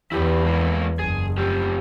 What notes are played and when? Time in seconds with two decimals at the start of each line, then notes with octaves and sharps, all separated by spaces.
0.12 E2 E4 G4 B4
0.45 G#3 A#3 E4
0.99 F#1 G#4
1.38 A3 F4 G4